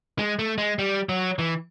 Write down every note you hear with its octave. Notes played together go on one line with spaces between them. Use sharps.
G#3
A3
G#3
G3
F#3
E3